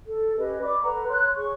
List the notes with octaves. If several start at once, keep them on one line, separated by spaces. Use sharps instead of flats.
A4
C#4 G4 B4 D#5
D5 B5 D6
A4 B4 F#5 A#5
C#5 C6 F#6
G#4 C#5 C#6